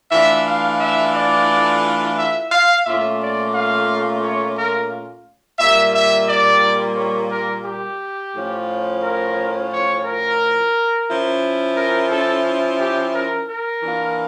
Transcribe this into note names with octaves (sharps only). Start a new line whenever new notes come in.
E3 A3 D4 F4 E5
F5
E5
D5
E5
F5
A#2 A3 C#4 F4 E5
D5
F5
C#5
A#4
A#2 G3 A#3 E5
E5
D5
C#5
A#4
G4
A2 F3 C#4 F4
A#4
C#5
A#4
F3 C#4 E4
A#4
A4
G4
A#4
A#4
E3 A#3 D4 F4